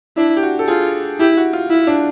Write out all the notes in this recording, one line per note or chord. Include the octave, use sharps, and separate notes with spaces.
D4 E4
G4
F#4
A4
F4 G#4
E4 G4
F#4
F4
E4
D4